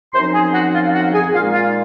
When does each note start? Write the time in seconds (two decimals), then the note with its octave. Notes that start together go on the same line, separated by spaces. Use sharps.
0.13 F#2 F3 C4 D#4 C5 C6
0.33 G#4 G#5
0.53 F#4 F#5
0.73 F4 F5
0.87 F5
0.93 F#4 F#5
1.13 G#4 G#5
1.33 A#2 G#3 D#4 F4 F5
1.53 F4 F5